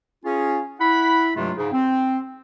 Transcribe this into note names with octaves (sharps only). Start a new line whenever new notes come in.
C#4 F4 G#4
E4 F#5 B5
G2 C3 F#3 G#3 A3 F4
G#2 C#3
C4